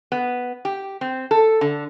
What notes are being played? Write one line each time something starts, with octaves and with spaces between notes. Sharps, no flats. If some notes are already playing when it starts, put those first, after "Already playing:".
B3
G4
C4
A4
D3